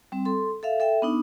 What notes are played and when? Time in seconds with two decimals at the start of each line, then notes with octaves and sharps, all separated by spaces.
0.12 G3 C4
0.25 A4 C6
0.63 A4 E5 F5
0.80 A4 E5 G5
1.02 B3 D4 D#4